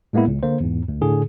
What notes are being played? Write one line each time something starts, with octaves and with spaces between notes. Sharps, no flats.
A2 G#3 A#3 B3 E4
C#2
D3 A#3 C5
E2 G#2
D2
A2 D3 G#4